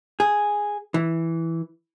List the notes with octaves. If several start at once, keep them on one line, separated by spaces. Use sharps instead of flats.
G#4
E3